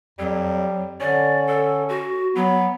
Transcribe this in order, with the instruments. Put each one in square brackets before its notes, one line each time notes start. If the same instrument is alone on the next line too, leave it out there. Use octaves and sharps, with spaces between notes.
[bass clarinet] F2 [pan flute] F#3 [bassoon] G3
[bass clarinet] D3 [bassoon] C#4 [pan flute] D5
[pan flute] A4
F#4
[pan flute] F#3 [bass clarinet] B3